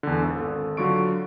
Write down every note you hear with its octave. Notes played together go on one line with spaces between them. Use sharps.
E2 D3
G#1 A4
D3 F#3 F4 C#6 D7